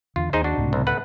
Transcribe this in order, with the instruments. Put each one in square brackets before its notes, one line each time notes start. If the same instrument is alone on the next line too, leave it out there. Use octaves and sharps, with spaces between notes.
[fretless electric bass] E2 D3 [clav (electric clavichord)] F4
[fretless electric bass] D#2 [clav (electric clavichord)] D#4 G#4 C5
[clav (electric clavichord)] D4 F#4
[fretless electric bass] C#2 A2 C3
[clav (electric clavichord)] C2
A3 B4 F#5